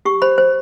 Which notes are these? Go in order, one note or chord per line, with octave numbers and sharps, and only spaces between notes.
G4 C#6
C5 B5
C5